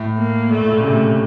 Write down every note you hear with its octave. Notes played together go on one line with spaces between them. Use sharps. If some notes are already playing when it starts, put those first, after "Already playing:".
Already playing: A2
A#3
A#2 A3
A2
A#2
C#3
C3 A3